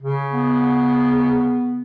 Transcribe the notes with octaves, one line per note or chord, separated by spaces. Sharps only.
C#3
B3